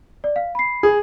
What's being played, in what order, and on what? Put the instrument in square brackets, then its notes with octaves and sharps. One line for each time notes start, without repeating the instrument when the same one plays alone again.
[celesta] D5
F5
B5 C7
[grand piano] G#4